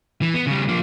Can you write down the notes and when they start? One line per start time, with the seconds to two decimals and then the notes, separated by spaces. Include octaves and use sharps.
0.22 E3
0.34 B3
0.47 C#3 G3
0.68 F3 A#3